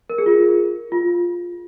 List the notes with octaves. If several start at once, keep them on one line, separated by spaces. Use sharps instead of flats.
A#4
G#4
F4
F4